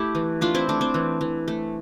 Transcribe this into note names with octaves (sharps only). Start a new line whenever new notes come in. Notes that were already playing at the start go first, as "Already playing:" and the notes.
Already playing: A3 E4 G4
E3
A3 D4 F4
C4 E4
A3 D4
C4
E3
E3
A3